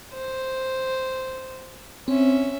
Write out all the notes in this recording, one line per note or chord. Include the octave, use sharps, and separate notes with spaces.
C5
C4 C#4 E5